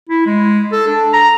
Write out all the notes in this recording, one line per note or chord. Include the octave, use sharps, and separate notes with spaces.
E4
G#3
A4
D4
A#5